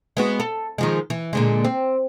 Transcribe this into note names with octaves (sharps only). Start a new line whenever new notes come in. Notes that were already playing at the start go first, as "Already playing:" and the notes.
G#3 B3 F#4
A4
D#3 F3 G#3
E3
A#2 D3 G#3
C4